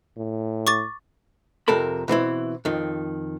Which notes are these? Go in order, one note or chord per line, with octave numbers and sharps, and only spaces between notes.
A2
C#6 D6 A6
F2 C3 A4 A#4 B5
B2 E3 C4 E4
F2 D#3